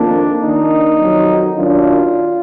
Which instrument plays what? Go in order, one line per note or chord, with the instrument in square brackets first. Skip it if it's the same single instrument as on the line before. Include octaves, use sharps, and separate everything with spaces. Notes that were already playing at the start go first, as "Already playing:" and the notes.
Already playing: [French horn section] F2 D#3 A#3 F4 [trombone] D4
[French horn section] D#3 A#3 D4 [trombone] D#4
[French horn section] F2 D#3 F#3
[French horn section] F#2 D#3 F#3 D4 [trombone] F4